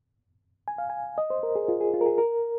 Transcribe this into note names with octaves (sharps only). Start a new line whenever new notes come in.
G#5
F5
G#5
D#5
C5
A#4
G#4
F4
G#4
F4
A#4
G#4
A#4